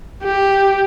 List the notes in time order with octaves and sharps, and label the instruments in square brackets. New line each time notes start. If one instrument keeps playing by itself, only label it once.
[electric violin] G4